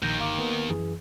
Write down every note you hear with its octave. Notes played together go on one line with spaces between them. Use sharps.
A#1 D#2 D#3 G6 A#6
G1 F5 D6
A#3 B3
F#2 E3 G#4